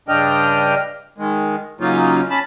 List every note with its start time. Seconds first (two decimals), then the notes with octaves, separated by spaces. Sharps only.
0.09 G2 C#3 D4 D#5 G5 F6
1.18 D#3 G#3
1.81 C#3 F#3 A#3 C#4 D#4 F4
2.30 C#4 A5 B5